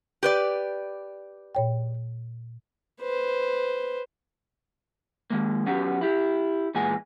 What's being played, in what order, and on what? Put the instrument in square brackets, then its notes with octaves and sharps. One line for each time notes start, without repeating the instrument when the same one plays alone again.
[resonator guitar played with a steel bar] G4 B4 D5
[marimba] A#2 C#5 G5
[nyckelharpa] B4 C5
[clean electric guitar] D#3 G#3 A#3
F#3 B3 C#4 F#4 G4
E4 G4
E2 A#2 G#3 B3 G#5